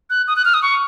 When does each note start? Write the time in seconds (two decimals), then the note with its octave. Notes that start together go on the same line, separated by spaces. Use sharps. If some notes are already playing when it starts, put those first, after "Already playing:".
0.10 F#6
0.28 D#6
0.36 F#6
0.45 F6
0.54 D#6
0.62 C#6